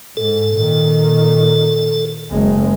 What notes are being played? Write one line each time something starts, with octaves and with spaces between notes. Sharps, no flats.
G#2 A4
A#2 D#3
F#1 G#3